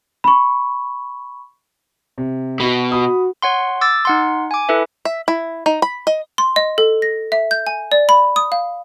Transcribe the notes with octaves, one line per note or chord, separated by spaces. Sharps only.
B5 C#6
C3
B2 F#4 B5
F#4 B5 D#6
C#5 F#5 C6
D6 E6 A6
D#4 F#5 C6
G#5 D6
E4 A4 B4 E5
E5
E4
D#4
B5
D#5
C6
D#5
A4
A#6
E5
G6
G#5
D5
B5
D#6
F5